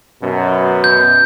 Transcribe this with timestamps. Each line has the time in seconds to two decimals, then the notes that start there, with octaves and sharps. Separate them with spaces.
0.21 F#2 B2
0.84 G6